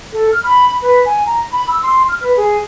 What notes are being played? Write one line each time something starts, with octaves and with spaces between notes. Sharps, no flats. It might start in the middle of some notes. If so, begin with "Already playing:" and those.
A4
F6
B5
B4
G#5
A#5
B5
E6
C6
F6
B4
G#4